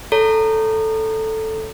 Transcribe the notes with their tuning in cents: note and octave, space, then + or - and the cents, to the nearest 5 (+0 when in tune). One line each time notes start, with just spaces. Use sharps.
A4 +0 C#5 +15 A#5 -15